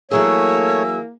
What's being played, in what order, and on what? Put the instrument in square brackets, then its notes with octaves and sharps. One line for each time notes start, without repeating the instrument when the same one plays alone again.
[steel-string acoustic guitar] E3 F#3 G#4 [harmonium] A3 C#5 [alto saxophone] A#3 [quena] E6